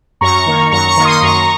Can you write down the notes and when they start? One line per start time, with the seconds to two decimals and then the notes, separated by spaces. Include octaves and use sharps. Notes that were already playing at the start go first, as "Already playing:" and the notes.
0.21 F#2 A#5 C#6
0.46 D#3 A#3
0.71 F#2 A#5 C#6
0.88 A#5 C#6
0.97 D#3 A#3
1.05 C6 D#6
1.22 F#2 A#5 C#6